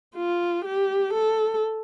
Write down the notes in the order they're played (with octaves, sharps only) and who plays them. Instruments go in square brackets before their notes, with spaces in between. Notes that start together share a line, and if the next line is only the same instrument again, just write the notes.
[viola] F4
G4
A4